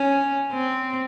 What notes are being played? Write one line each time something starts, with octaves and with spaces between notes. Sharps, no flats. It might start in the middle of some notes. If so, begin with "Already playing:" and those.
Already playing: C#4
C4